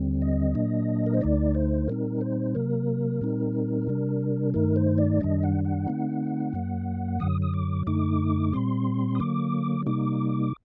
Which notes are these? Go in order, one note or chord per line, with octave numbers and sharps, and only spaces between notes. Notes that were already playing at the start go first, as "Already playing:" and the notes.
Already playing: D#2 D3 G3 C4
D#5
A#2 F#3 A#3 D4
A#4
C5
D2 D3 A3 D#4 D5
C5
A#2 G3 C4 D#4 A#4
C5
C3 F#3 A#3 A#4
A#2 G3 C4 D#4
C3 G3 D4
G2 D#3 A3 D#4 A#4
C5
D5
F#2 D#3 G3 D4 D#5
F#5
F#5
D3 A3 C4 D#4
F#2 F#3 A#3
F#2 D3 F#3 D#6
D#6
D6
F#2 D3 A3 D#4 D6
A#2 G3 C4 C6
D#6
D3 F#3 A#3 D6
C3 G3 A#3 D#4 D6